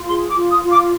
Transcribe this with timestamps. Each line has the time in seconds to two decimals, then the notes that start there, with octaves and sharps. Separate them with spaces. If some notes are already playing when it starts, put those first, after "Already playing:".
Already playing: F4
0.09 G#4 C6
0.29 D6
0.36 F4
0.50 D#6
0.63 F4
0.71 D6